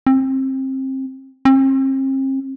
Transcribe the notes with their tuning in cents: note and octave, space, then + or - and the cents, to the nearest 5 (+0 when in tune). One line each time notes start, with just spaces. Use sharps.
C4 +25
C4 +40